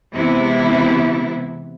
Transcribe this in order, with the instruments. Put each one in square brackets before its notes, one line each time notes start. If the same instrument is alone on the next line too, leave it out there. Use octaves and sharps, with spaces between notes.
[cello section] C3 E3 G#3 B3 E4